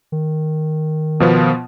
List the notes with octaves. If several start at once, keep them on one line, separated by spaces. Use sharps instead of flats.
D#3
B2 F3 B3